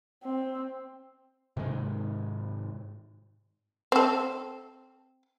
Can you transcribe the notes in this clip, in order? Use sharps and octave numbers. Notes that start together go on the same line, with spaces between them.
C4
G#2 C3 D#3 G#3
C4 A4